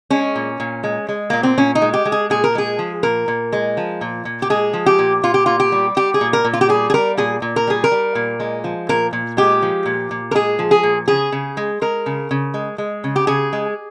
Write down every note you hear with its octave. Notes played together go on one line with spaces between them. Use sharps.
G#3 C#4
A#2
A#2
G#3
G#3
A#2 A#3
C4
A#2 C#4
D#4
G#3
G4
G#3
G#4
A#2 G#4
A#4
G#3 G#4
F3
A#2 A#4
A#2
G#3
F3
A#2
A#2
G4
G#3 G#4
F3
G4
A#2
A#2 F4
G4
A#2 F4
G4
G3
G3 G4
G#4
A#2
A#4
A#2
F4
G4
G3 G#4
G#4
G3 A#4
A#2 G#4
A#2
A#4
G3 G#4
A#4
G3
A#2
G#3
F3
A#2 A#4
A#2
G#3 G4
F3
A#2
A#2
A#4
G#3 G#4
F3
G#4
A#2
C#3 G#4
C#3
G#3
G#3 A#4
C#3
C#3
G#3
G#3
C#3
G4
C#3 G#4
G#3